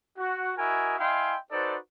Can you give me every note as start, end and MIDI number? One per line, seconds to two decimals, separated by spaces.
0.18 0.53 66
0.58 0.94 64
0.58 0.94 66
0.58 0.94 70
0.58 0.94 75
0.58 0.94 80
0.98 1.36 64
0.98 1.36 75
0.98 1.36 77
0.98 1.36 79
0.98 1.36 80
0.98 1.36 84
1.51 1.75 63
1.51 1.75 66
1.51 1.75 69
1.51 1.75 71
1.51 1.75 72
1.51 1.75 74